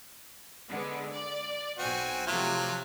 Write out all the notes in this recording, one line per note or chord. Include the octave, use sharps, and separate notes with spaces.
D3 G#3 B3
D5
B1 C4 F#4 G#5
C3 F3 F#3 A3 F4